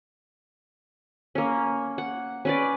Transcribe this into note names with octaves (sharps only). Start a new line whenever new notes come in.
A#3 C#4
F#5
C#4 B4 D5